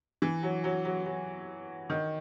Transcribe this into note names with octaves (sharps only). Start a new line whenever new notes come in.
E3
F#3
F#3
F#3
F#3
D#3